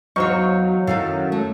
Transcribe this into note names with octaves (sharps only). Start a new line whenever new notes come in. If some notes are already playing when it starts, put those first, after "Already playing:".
E2 F#3 D#4 C5 C#5 F5 C#6
F#2 D#3 E4 A4 F5
A3